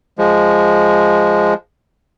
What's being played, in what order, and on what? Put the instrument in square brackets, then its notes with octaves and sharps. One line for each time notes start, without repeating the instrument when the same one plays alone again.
[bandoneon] F3 G#3